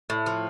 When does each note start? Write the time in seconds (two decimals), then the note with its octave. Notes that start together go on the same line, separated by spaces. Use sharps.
0.10 A2
0.26 F3